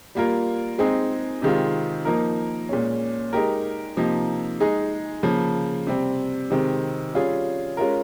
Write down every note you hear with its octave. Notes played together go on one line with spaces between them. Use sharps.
G3 A#3 F4 A#4
G#3 C4 D#4 G#4
C3 D#3 G#3 C4 F4
F3 A#3 D#4 A#4
A#2 G#3 C#4
G#3 D#4 G4 A#4
C3 F3 A#3 D#4
G#3 D#4 G#4
C#3 F3 A#3
C3 G3 C4
C3 D#3 G#3 C4
G3 C#4 F4 G#4
G#3 C#4 F4 A#4